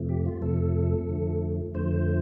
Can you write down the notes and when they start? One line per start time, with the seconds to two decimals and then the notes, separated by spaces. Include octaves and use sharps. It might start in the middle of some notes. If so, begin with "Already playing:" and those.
Already playing: F2 C3 F3 A3
0.09 G4
0.26 F4
0.42 F2 C3 F3 A3 A4
1.08 F2 D3 F3 A3
1.74 F2 D3 F3 A3 C5